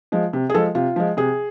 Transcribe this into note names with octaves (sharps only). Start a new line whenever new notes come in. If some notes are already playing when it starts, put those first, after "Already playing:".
F3 G#3
C3
G#4
F3 G#3 A4
C3 F4
F3 G#3
C3 G#4